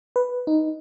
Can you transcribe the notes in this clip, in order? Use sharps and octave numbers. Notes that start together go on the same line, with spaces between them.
B4
D#4